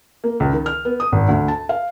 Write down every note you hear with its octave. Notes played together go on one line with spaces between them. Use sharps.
A#3
C#2
D#3
F6
B3
D#6
G#1
D2
A5
F5